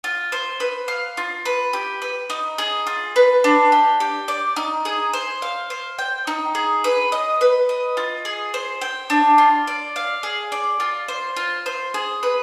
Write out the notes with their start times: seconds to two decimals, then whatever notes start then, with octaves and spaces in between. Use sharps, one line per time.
0.04 F4
0.32 C5
0.60 B4
0.88 F5
1.17 F4
1.45 B4
1.73 G4
2.02 B4
2.30 D#4
2.58 G#4
2.87 F4
3.16 B4
3.44 D4
3.72 G4
4.00 G4
4.28 D5
4.56 D#4
4.85 G#4
5.13 C5
5.42 F5
5.70 C5
5.99 G5
6.27 D#4
6.55 G#4
6.84 B4
7.12 D#5
7.41 B4
7.69 D#5
7.97 F4
8.25 G#4
8.54 C5
8.81 G5
9.10 D4
9.38 F4
9.67 D5
9.96 F5
10.23 G#4
10.52 D5
10.80 F4
11.08 C5
11.37 F4
11.66 C5
11.94 G#4
12.23 B4